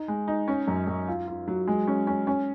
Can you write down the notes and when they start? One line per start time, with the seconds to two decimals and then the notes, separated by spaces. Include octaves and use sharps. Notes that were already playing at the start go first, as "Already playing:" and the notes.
Already playing: D#4
0.08 G#3
0.28 D#4
0.48 C#4
0.68 F#2
0.87 F#2
1.08 F4
1.28 F4
1.48 F#3
1.67 G#3
1.87 C#4
2.07 C#4
2.27 C#4